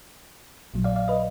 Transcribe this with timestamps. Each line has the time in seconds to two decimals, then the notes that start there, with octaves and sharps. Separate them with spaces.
0.74 A#1 A#2 F#3
0.84 D5 F5
0.96 D5 F5
1.08 B4 D#5